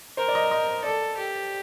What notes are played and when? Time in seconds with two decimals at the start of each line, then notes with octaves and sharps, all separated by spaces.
0.17 A#4 C5
0.28 D5
0.35 D#5
0.51 D#5
0.83 A4 D5
1.16 G4